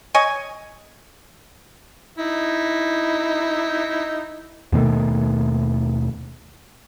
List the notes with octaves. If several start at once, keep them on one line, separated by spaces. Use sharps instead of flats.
C#5 D#5 G#5
D#4 E4
D#2 B2 D#3 A3